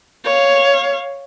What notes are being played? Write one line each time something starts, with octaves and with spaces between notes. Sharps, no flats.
C#5 F5